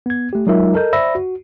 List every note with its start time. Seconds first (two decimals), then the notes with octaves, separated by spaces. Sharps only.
0.06 B3 G#6
0.33 A3 G4
0.47 F#3 G#3 D#4 F4 A#4 E5
0.74 A4 A#4 D#5 G6
0.93 C5 D5 E5 B5 E6 A#6
1.15 F#4